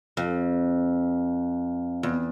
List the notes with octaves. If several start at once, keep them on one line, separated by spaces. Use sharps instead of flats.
F2
E2